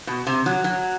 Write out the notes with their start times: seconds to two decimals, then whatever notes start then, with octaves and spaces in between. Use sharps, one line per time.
0.07 B2
0.27 C3
0.46 F#3
0.64 F#3